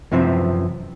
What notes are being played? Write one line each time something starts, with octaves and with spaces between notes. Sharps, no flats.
F#2 C3 E3 F3 C4